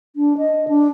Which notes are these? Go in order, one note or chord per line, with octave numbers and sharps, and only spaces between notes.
D4
D#5
D4